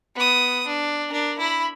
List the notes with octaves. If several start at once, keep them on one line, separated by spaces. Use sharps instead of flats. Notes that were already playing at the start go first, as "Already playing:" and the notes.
B3 D#6
D4
D4 A#4
E4 B5